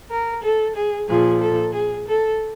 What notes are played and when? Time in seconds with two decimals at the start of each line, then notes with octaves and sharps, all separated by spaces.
0.10 A#4
0.43 A4
0.75 G#4
1.08 A#2 F3 G#4
1.41 A4
1.74 G#4
2.07 A4